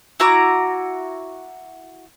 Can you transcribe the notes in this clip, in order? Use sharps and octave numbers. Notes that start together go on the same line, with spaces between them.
E4 F#4 A#5 D6